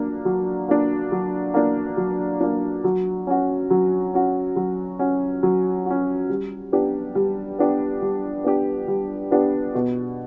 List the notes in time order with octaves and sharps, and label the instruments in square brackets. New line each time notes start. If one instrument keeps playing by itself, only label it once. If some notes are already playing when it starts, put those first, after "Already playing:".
Already playing: [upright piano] F#3 A#3 D4
F#3
A#3 D4
F#3
A#3 D4
F#3
A#3 D4
F#3
C#4 F#4
F#3
C#4 F#4
F#3
C#4 F#4
F#3
C#4 F#4
G3
B3 D4 G4
G3
B3 D4 G4
G3
B3 D4 G4
G3
B3 D4 G4
B2